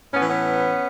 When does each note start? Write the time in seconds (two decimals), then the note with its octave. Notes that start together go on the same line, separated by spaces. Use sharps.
0.14 A2 E3 B3 C#4
0.29 B3 C#4